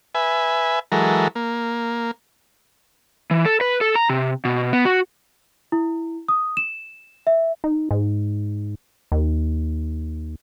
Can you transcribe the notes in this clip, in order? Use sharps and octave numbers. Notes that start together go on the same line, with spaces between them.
B4 E5 G#5
E3 F#3 G#3 A4 A#4
A#3
E3
A4
B4
A4
A#5
C3
B2
B3
F#4
E4
D#6
E7
E5
D#4
G#2
D#2